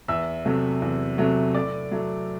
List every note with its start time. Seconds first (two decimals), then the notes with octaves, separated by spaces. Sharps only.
0.08 E2 E5 E6
0.45 C3 F#3 A3
0.82 E2
1.18 C3 F#3 A3
1.55 A2 D5 D6
1.91 F#3 A3